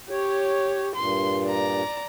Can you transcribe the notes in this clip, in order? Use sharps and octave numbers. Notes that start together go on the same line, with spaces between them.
G4 C#5
G2 A#2 C6
D5 A#5